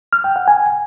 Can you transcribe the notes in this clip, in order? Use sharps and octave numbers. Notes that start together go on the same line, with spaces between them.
F6
G5
F#5
G#5